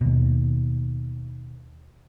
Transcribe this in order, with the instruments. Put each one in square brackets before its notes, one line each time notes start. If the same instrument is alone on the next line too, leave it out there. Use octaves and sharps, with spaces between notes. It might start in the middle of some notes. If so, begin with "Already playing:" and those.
[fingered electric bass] D#2 B2